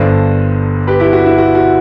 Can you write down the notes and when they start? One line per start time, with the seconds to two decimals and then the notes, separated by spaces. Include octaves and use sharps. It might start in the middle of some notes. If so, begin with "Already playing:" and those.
Already playing: G1 G2 D3 A4 C5
0.87 G4 B4
1.00 E4 G4
1.13 F#4
1.26 E4
1.38 F#4
1.55 F#4